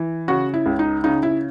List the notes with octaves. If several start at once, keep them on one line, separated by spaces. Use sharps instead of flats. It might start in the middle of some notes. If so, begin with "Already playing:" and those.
Already playing: E3
C#3 F#4
E4
C#2
D#4
C#3 D#4
E4